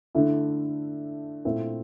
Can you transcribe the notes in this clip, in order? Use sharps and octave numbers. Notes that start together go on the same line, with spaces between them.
D3 A3 E4
A#2 A3 C4 E4